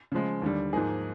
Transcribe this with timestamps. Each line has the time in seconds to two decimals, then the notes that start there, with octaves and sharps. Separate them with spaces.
0.12 C#3 F3 G#3
0.42 D#2 D3 G3
0.73 G#2 F3 A#3 D#4 G#4